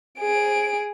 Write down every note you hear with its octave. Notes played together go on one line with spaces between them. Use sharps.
G#4 D7